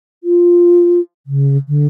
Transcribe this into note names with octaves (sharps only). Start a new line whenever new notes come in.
F4
C#3
D3